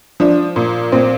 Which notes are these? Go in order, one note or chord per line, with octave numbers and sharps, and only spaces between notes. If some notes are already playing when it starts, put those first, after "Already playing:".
F3 D4
A#2
A#2 C4